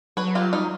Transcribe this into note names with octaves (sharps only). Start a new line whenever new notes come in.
F#3 B4 C#5
F4 G4
G3 D#4 F4
F#3